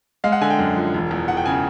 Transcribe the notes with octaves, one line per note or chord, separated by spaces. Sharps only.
G#3 F5
F#5
D3 G#5
G5
F#2
F3
E1
E2
E1 F#5
G5
C#3 G#5